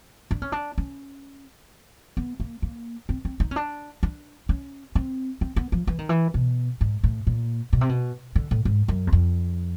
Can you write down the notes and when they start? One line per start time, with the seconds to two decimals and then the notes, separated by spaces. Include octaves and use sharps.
0.31 D4
0.42 C#4
0.52 D4
0.78 C#4
2.17 B3
2.40 A#3
2.62 A#3
3.09 C4
3.25 C4
3.40 D#4
3.51 C#4
3.56 D4
4.03 D4
4.49 C#4
4.95 C4
5.41 C4
5.56 B3
5.72 F3
5.87 E3
5.99 D#3
6.09 E3
6.34 B2
6.81 G#2
7.04 A2
7.27 A#2
7.73 B2
7.81 C3
7.89 B2
8.36 D3
8.51 A2
8.65 G#2
8.88 F#2
9.07 E2
9.12 F2